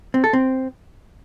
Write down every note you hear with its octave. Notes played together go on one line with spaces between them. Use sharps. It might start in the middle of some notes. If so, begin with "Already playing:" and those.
C4
A4
C4